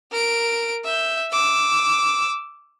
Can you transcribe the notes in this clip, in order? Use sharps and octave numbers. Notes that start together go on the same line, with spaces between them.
A#4 D7
E5 G6
D6 E6